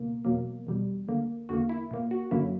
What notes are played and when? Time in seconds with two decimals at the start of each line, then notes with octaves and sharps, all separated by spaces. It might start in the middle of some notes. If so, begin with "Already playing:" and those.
Already playing: C#2 B2 A#3
0.25 E2 B2 F#3 A#3
0.67 E2 B2 G3
1.08 D2 D3 A#3
1.49 E2 D3 A#3 F#4
1.69 E4
1.91 A#2 A#3
2.11 F#4
2.31 F#2 D3 F#3 A#3 E4